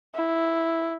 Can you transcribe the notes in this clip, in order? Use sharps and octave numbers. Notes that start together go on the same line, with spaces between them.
E4